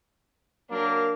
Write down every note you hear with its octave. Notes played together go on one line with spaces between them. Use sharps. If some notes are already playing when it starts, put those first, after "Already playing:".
F#3 A#3 D4 A#4